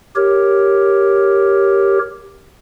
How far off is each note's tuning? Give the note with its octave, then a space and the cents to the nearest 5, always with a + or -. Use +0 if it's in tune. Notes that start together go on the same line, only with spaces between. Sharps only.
G4 +0 A#4 +0 C#5 +0